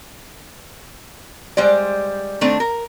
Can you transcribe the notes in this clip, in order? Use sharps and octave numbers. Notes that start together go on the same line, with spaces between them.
G3 G#3 C5 D5
D#3 A3 C4 D4
A#4